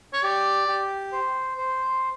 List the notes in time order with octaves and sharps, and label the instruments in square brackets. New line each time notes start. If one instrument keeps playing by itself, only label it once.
[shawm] C#5
[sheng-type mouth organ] G4 [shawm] D5
[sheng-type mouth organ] G4
C5
C5